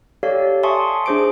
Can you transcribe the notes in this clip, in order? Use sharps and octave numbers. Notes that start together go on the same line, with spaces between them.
G4 A4 C#5 D5 F5
E5 G#5 A5 C6 C#6 D#6
D4 G#4 C5 D6 D7